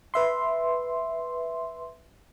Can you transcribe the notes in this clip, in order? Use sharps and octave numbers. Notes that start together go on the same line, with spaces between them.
B4 E5 C6